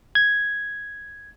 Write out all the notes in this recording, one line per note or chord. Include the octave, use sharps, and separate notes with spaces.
G#6